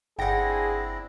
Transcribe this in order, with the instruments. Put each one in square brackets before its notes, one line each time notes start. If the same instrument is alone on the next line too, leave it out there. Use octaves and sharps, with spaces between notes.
[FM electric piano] G1 A#6 [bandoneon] C4 D4 E4 [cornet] G#4 [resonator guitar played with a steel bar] F#5 G5